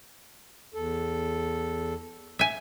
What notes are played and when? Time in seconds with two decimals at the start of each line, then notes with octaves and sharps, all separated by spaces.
0.74 E2 A4
2.39 E5 G#5